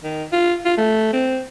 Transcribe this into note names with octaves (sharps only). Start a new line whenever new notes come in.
D#3
F4
F4
A3
C4